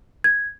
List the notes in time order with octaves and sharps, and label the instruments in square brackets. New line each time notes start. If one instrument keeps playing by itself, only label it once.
[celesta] G#6